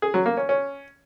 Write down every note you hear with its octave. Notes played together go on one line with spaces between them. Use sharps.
G#4
F#3
A#3
C#4
C#4